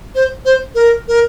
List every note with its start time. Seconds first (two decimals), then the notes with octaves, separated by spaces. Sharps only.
0.15 C5
0.45 C5
0.75 A#4
1.08 A#4